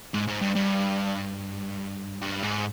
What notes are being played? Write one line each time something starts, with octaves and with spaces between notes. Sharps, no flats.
G#2
G#2
G2
G2
G2
G#2